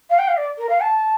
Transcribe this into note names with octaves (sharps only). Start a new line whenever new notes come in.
F5
G5
F5
D5
A#4
F5
A5